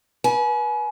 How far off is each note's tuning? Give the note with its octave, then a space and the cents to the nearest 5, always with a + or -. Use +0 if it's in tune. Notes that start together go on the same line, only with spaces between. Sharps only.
B4 -35 G#5 +35